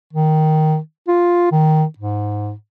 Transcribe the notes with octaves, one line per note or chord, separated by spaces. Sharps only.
D#3
F4
D#3
G#2